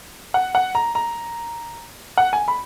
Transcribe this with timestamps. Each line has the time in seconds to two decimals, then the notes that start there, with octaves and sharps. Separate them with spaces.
0.34 F#5
0.55 F#5
0.75 A#5
0.95 A#5
2.17 F#5
2.33 G#5
2.48 B5